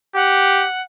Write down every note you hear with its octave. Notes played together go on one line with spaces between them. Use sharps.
G4 F#5